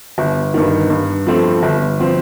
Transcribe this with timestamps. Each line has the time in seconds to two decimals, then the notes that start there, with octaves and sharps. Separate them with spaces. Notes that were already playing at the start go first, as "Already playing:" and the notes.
0.18 G1
0.54 G2 D#3
0.90 G2
1.27 F3 A3 C4
1.63 G1
2.00 F3 C4